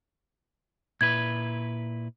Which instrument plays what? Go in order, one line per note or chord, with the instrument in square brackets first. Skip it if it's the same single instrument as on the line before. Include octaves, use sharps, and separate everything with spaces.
[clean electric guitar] A#2 E4 B4 [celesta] G#6